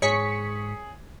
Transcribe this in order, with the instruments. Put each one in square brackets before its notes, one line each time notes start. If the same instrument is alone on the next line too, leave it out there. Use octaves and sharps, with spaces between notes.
[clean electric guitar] G#2 [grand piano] G#4 [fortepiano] C#5 [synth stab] C#6 B6 C#7